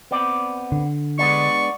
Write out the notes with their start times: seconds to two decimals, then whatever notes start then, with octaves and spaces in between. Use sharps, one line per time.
0.11 B3 C4 D5
0.72 D3
1.19 G#3 B3 D4 D5 C#6